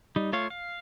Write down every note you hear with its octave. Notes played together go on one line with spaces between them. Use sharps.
G3 D#4
A3 F4 C#5 F5
F5